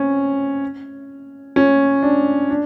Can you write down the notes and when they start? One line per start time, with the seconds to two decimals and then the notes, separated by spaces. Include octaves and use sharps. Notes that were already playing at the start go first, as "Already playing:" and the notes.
Already playing: C4 C#4
1.56 C#4
2.02 D4
2.50 D4